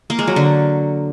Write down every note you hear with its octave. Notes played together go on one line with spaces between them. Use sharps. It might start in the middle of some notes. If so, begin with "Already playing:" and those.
A#3
G#3
F#3
D3